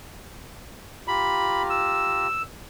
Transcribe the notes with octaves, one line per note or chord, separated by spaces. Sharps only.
F4 G4 A#5 B5
E6